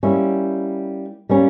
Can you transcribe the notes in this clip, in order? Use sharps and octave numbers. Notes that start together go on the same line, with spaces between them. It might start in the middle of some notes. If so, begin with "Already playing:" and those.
G3 A#3 C#4 E4
G3 A#3 C#4